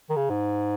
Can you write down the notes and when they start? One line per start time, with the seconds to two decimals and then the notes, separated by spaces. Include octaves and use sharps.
0.10 D#3
0.16 C#3
0.30 G#2